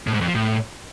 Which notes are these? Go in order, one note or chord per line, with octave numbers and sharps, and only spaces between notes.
A2
G#2
F2
F3
A2